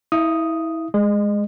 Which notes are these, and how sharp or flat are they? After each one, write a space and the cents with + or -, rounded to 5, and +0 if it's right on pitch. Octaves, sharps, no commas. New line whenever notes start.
E4 -30 E5 +45 D#6 +0
G#3 +0 D#5 -30